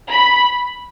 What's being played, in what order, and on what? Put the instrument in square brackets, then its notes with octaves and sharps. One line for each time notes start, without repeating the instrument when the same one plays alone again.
[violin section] B5